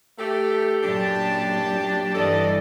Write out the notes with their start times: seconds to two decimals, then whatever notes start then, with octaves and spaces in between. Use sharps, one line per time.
0.18 A3 G4
0.84 F#2 A#2 D4 G4 A5
2.15 G2 E3 D4 A4 D5 D#5